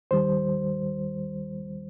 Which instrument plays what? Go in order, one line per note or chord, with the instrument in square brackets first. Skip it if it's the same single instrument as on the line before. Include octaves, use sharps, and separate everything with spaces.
[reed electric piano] D#2 D#3 G3 C5